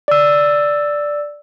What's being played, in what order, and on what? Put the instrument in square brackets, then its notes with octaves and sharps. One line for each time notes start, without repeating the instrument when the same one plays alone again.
[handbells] D5 E6